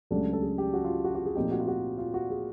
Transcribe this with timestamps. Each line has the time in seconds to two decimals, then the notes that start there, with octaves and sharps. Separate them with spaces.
0.11 C#2 C#3 F#3 A3 D4 G4
0.33 A4
0.42 G#4
0.58 G4
0.74 F#4
0.84 F4
1.04 F#4
1.15 F#4
1.26 G#4
1.35 A#2 F3 A3 C4 D#4 G4
1.51 F#4
1.60 F4
1.68 F#4
1.98 F4
2.14 F#4
2.30 G#4